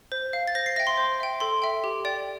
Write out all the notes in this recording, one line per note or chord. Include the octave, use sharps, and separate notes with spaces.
C5
F5
A6
C5 A#6
C7
E5 G5 A#6
C6
C5
E5 G5
A4 C6
E5 G5
G4
D5 G5